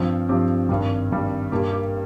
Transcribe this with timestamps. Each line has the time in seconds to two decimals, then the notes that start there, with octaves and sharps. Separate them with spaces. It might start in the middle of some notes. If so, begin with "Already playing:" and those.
Already playing: G2 F3 C4 C5
0.29 G2 F3 C4 G4
0.69 G#1 G2 G3
1.10 G#1 G2 G3
1.52 G2 G3 A#3 G4
1.71 G4